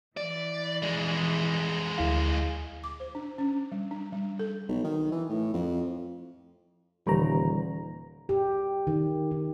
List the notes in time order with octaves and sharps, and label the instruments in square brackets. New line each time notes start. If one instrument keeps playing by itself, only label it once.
[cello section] E3 [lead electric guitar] D5
[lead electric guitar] F2 G#3
[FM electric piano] D2 E4 F5
[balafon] D6
C5
D4
C#4
G3
D4
G3
A4
[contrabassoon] B1
D#3
E3
A2
F2
[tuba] D#1 [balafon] D3 E3 B4 [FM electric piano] G3 A#5
[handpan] G4
D#3
D#3